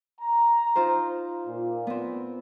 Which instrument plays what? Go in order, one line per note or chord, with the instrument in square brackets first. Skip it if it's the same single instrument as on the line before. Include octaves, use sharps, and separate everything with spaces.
[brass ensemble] A#5
[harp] D#4 F4 C5
[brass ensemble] A#2
[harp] B3 C4